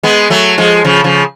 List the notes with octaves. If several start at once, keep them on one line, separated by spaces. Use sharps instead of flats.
G#3 B3
F#3 A3
F3 G#3
C#3 F3
C#3 F3